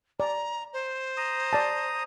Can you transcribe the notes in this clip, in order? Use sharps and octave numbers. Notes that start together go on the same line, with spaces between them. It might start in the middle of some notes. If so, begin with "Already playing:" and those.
D5 A#5
C5
A#5 D#6
D5 A5